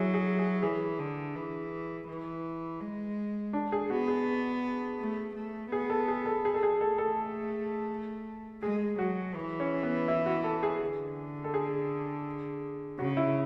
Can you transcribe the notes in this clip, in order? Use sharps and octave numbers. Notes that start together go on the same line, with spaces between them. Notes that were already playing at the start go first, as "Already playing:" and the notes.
Already playing: F#3 E4 F#4 G#4
G#4
G#4
E3 G#4
D3
E3
E3
G#3
D4
G#4
B3 F#4
G#4
A3
A3
B3 G#4
A4
G#4
A4
G#4
A4
G#4
A3 A4
A4
G#3 G#4
F#3 F#4
E3
C#4
B3
E4
F#4
A4
G#4
D3
A4
G#4
C#3 F#4
E4